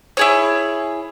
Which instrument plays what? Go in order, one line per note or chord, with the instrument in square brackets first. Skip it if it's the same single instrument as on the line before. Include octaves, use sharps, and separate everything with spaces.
[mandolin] E4 G#4 C#5